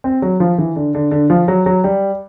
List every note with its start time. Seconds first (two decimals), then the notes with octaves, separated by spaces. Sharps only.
0.04 C4
0.22 F#3
0.40 F3
0.58 E3
0.76 D3
0.95 D3
1.11 D3
1.30 F3
1.48 F#3
1.66 F#3
1.84 G3